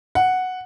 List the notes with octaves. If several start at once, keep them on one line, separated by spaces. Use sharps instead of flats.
F#5